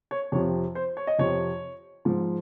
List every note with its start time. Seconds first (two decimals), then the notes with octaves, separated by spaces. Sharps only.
0.11 C#5
0.32 F2 C3 F3 C#5
0.75 C5
0.97 C#5
1.07 D#5
1.19 F2 C3 F3 C#5
2.05 G#2 F3